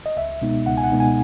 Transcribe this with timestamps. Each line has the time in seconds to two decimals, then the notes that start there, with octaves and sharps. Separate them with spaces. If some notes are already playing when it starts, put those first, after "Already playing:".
0.06 D#5
0.17 C#2 E5
0.42 B2 G#3 B3 D#4
0.66 C#2 F#5
0.77 G#5
0.84 F#5
0.92 B2 G#3 B3 D#4
1.00 G#5